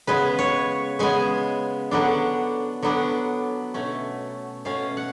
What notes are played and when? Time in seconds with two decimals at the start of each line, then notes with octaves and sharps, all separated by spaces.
0.07 C#3 G#3 B3 B4
0.39 C#5
0.99 C#3 G#3 B3 G#5
1.91 D3 F#3 B3 D4
2.83 D3 F#3 B3 D4
3.74 B2 A3 C#4
4.65 B2 A3 C#4 F5
4.97 F#5